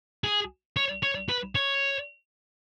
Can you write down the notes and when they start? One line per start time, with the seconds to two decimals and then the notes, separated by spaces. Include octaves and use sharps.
0.24 G#4
0.77 C#5
1.03 C#5
1.29 B4
1.55 C#5